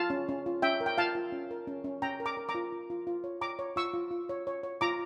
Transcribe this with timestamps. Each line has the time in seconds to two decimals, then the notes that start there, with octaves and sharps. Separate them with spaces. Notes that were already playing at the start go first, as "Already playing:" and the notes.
Already playing: F4 F5 A5
0.10 C#4
0.29 C#4
0.46 F4
0.62 C#4 E5 G5
0.81 A#4
0.86 G5
0.98 F4 F5 A5
1.15 F4
1.32 C#4
1.51 A#4
1.67 C#4
1.84 C#4
2.02 C#4 G5 A#5
2.20 A#4
2.26 A#5 D6
2.37 A#4
2.49 A#5 D6
2.55 F4
2.73 F4
2.90 F4
3.07 F4
3.24 C#5
3.41 C#5 A#5 D6
3.59 C#5
3.76 F4 C#6 E6
3.93 F4
4.11 F4
4.29 C#5
4.47 C#5
4.63 C#5
4.81 F4 A#5 D6